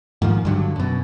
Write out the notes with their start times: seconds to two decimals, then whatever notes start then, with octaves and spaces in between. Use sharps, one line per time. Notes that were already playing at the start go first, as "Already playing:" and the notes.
0.22 G#2 D#3 F3
0.45 G2 D3 F#3
0.76 F#2 B2